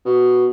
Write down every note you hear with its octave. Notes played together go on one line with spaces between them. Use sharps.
B2